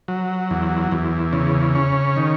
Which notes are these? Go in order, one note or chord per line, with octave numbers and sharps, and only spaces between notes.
F#3
E2
E2
C#3
C#4
D#3